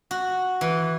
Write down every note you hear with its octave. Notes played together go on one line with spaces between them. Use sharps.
F#4
E3